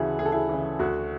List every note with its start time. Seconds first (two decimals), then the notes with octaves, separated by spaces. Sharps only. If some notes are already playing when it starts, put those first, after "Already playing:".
Already playing: D2 C#3 E3 E4 F#4 G#4 A4
0.19 D2 G#4
0.26 A4
0.32 E4 G#4
0.49 C#3 E3
0.79 D2 F#4